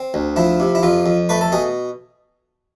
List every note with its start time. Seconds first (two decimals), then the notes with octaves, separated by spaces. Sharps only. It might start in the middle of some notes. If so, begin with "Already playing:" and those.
Already playing: C4
0.14 D2
0.36 F3 E4
0.60 C3
0.75 E4
0.83 F2 F4
1.06 F2
1.29 A3 B4
1.41 A4
1.52 B2 G#4